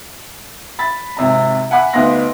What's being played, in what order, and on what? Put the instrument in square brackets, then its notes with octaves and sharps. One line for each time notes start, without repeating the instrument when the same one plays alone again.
[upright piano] B5 A6
G#1 C3 A#5
E5 F#5 G#5 B5 D6 F#6
D2 B3 D#4 F5 C6 A#6